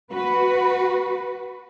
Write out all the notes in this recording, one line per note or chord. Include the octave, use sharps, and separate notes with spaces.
F#4 B4